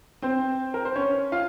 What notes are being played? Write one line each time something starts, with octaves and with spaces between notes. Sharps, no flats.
C4 C5
A#4
C5
C#4 C#5
F4 F5